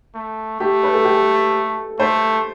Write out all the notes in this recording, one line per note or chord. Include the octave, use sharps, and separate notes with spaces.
A3
A3 G4
B4
A4
G4
A4
A3 C5